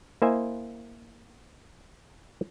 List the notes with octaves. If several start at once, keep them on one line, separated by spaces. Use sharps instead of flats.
A#3 E4 C5 D#5 E5 G#5